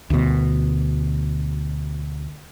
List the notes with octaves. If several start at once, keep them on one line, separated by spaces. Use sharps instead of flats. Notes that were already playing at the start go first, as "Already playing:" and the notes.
D2 B2